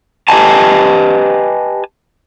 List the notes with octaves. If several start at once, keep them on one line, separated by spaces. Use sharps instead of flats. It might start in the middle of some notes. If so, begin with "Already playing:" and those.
G4 B4 D#5 G#5 A5